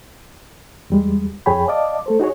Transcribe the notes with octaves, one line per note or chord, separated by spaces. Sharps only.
E2 G3 G#3
F2 G#4 C#5 G5 G#5 B5
D5 D#5 F5 A5 D6
A3 A4 C5
D#4 F#4 G#4 C#5